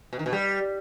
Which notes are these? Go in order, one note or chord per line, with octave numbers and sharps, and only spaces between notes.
B2
D#3
B2
G3